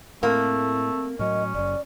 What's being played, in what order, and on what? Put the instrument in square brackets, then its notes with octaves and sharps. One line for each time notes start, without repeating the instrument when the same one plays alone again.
[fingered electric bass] A2 [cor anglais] A3 [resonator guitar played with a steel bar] A#3 [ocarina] C4
[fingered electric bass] A2 F#3 [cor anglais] C#4 [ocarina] D#5
[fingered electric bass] F#1 F#2 [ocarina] D5